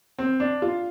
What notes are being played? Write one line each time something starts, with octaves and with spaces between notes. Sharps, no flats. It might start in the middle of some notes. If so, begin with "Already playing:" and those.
C4
D4
F4